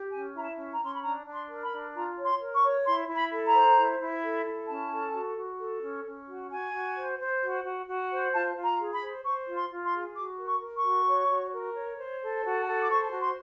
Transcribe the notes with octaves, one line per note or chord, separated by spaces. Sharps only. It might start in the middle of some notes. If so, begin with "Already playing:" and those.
Already playing: G4
C#4 G#5
E4 A#5
A5
C#4
A#5
C#4 C6
B5
D4 A#5
D4
C6
A#4
B5
D4
F4 A#5
C#5
C6
A#4
C#6
C#5
E4 C6
E4
B5
A4
A#5
C5
E4
E4
A4
E4
C#4 A5
A4
F#4
F#4
A4
C#4
C#4
F#4
F#4 G#5
F#4
C5
C5
F#4
F#4
F#4
C5
F4 A5
F4
A#5
G#4
B5
C5
C5 C#6
F4
C6
F4
C6
G#4
F#4 D6
A#4
C#6
A#4
C#6
F#4
C#5
F#4
A#4
C#5
C5
A4
F#4
A4
D6
C5 C#6
F#4
C6